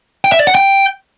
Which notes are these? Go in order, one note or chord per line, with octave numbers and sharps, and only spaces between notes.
G5
E5
D5
F#5
G5